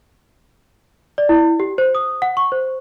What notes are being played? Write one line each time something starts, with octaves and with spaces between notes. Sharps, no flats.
D5
E4
G4
C5
D#6
F#5
C#6
C5